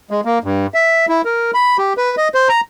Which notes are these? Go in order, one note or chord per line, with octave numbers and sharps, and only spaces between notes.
G#3
A#3
G2
E5
E4
A#4
B5
G4
B4
D#5
C5
A#5